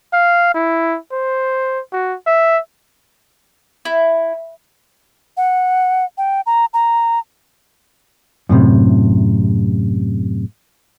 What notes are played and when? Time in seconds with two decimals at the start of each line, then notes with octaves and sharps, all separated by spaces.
0.13 F5
0.55 E4
1.12 C5
1.93 F#4
2.27 E5
3.85 E4
5.37 F#5
6.18 G5
6.46 A#5
6.74 A#5
8.49 F#2 A2 C3